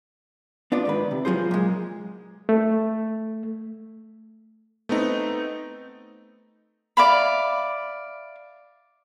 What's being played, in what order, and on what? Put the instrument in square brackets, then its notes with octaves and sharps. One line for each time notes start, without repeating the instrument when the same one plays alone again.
[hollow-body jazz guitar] B3 D4 F4 D5
G#2 D#3 B4
C3
F3 F#3 F4 G#4 C5
A#2 G#3
[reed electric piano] A3
[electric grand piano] A3 B3 C4 D#4
[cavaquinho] D5 E5 F5 B5